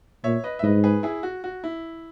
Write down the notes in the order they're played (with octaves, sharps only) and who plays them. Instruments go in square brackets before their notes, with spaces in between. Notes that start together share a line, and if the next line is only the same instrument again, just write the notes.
[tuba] A#2 [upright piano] C#5 E5
[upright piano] B4 D#5
E5
[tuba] G#2 [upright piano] B4 D#5
[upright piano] G#4 B4
E4 G#4
F#4
F#4
E4